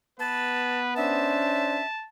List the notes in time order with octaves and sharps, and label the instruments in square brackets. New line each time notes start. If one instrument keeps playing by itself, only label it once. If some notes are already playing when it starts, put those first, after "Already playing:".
[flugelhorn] B3 [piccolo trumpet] B4 [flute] A5
[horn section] C#4 D4 C5 [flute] E5 [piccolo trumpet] A5